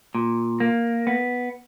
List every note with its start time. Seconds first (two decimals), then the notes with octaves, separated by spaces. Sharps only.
0.15 A#2
0.60 A#3
1.07 B3